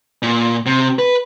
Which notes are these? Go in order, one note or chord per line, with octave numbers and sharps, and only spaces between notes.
A#2
C3
B4